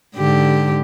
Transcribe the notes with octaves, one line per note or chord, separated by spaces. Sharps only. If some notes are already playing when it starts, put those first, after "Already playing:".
G#2 D3 G4